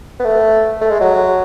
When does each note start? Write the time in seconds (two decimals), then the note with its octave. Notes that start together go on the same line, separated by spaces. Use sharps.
0.20 B3
0.25 A3
0.81 A3
0.91 G#3
1.01 F#3